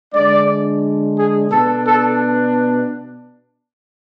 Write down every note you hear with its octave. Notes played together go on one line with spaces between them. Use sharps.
D3 G#3 D4 D5
G#4
B2 B3 D4 A4
A4